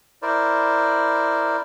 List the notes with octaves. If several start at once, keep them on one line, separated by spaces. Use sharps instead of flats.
E4 A#4 C5 D5